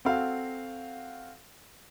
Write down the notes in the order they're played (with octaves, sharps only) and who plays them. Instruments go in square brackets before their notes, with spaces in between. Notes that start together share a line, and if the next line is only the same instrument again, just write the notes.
[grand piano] C4 F#4 A4 F5